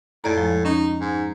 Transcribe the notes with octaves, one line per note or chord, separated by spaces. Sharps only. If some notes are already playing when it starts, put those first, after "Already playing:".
F2 A2 D5 A#5
F3 G#3
C#4 D#4
G#2